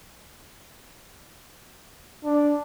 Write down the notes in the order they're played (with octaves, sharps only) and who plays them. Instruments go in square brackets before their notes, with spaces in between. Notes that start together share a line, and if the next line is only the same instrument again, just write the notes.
[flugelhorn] D4